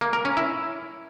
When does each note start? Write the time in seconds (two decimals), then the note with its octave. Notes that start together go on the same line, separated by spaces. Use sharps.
0.01 A#3
0.13 A#4
0.25 C#4
0.37 E4